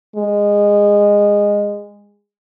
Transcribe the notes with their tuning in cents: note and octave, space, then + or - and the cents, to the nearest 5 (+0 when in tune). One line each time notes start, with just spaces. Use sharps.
G#3 -20